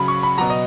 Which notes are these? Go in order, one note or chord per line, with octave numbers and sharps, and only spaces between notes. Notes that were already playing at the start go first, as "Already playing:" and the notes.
Already playing: C#3 F#3 B5
C#6
B5
B2 F#3 A#5
D#5